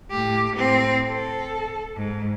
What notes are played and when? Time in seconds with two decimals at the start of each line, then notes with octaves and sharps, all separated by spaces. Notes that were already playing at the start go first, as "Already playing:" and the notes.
0.11 A2 G4
0.53 A2 C4
1.09 A4
1.96 G#2